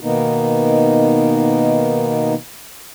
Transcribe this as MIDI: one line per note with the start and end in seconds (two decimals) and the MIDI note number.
0.01 2.34 47
0.01 2.34 51
0.01 2.34 58
0.01 2.34 59
0.01 2.34 63